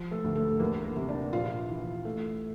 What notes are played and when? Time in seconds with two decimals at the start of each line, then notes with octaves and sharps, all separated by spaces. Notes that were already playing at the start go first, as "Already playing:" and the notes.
Already playing: F3
0.11 A3 A4
0.24 D2
0.35 A3 A4
0.60 E2 A#3 A#4
0.84 A#3 A#4
0.96 C3
1.08 D4 D5
1.33 A#1 F4 F5
1.69 E3
2.05 A3